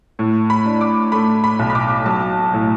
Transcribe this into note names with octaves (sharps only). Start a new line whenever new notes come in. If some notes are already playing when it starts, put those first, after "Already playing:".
A2
B5
D4
D6
A3 B5
B5
B1
B5
D6
F#3 A5
A2